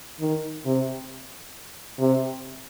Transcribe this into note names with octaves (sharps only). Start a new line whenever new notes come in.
D#3
C3
C3